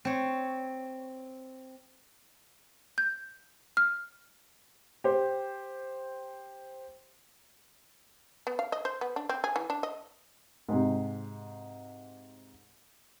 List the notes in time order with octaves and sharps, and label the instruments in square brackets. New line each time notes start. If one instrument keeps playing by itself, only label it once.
[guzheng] C4 C#5
[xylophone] G6
F6
[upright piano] G4 C5
[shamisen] B3
F5
D#5
C5
B3
D4
C4
G#4
E3
D4
D#5
[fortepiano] G#2 C3